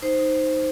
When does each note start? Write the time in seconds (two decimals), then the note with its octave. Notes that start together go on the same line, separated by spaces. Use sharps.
0.02 D#4 C5
0.19 D#4